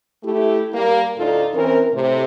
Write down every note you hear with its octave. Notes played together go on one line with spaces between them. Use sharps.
A3 E4 G4
G3 A#3
D2 A2 D4 D#4 F4 A4
E3 C4 C#4 A#4
A2 C3